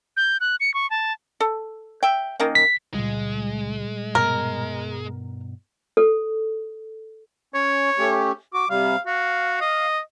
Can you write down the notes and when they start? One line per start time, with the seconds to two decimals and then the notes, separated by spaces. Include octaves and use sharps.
0.17 G6
0.40 F#6
0.60 C#7
0.74 C#6
0.90 A5
1.40 A4
2.03 E5 G5
2.40 D#3 A#3 C#4
2.55 B6
2.94 C#2 A#2 G3 G#3
4.15 G2 B2 B3 A#4
5.97 A4
7.54 C#4 C#5
7.98 A3 C#4 G4
8.54 F#4 D6
8.70 C3 G3 F5
9.06 F#4 F5
9.61 D#5